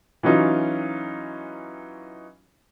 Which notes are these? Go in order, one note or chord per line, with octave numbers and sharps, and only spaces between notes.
E3 F#3 C#4 D#4 F4